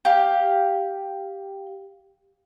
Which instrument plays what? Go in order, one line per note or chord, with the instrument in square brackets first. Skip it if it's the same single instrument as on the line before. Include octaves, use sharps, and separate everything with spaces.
[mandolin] G4 F5